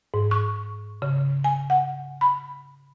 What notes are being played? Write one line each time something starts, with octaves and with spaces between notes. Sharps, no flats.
G#2
C#6
C#3
G#5
F#5
B5